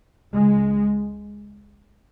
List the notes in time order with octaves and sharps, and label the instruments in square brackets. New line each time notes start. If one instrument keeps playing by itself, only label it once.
[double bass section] C#2 C#3 G#3